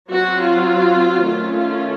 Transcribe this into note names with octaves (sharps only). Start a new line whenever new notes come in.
F#3 C4 F#4
F4
D#3 A3 C#4 F4
F4